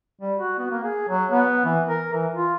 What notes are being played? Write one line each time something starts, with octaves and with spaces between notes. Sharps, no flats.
G3
F#4
B3
A#3
G#4
F#3
B3
E3
A#4
E3
F4